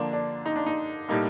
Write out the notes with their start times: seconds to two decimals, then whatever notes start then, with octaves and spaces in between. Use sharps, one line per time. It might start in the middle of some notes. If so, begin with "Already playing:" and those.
Already playing: D3 F3 A#3 D4
0.13 D4
0.46 D#4
0.56 D4
0.66 D#4
1.09 A2 G3 A#3 D#4